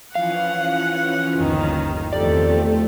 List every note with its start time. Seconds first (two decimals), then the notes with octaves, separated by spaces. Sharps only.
0.15 E3 F3 C#4 F5 F#5
1.36 G1 D#2 D#3
2.13 E2 D#3 F3 A3 C4 G4 A4 D5